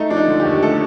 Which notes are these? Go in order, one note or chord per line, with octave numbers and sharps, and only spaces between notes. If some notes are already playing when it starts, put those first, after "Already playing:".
Already playing: A3 D#4
F3 D4
D#4
D3
G4
D#2
A3 A4